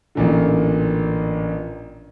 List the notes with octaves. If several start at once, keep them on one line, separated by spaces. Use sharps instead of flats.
A1 A#2 D3